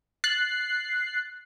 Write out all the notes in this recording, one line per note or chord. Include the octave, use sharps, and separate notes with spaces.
F#6 A6 C7